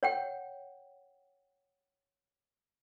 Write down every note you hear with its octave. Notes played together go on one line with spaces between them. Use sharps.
C#5 F#5 G5